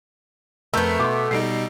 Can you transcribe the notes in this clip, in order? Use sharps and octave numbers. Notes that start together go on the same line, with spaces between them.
F2 A3 B3 A#4 E6 G6
B2 C6 D6
B2 G3 D#4 C7 D7